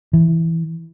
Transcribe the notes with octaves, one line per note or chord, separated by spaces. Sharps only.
E3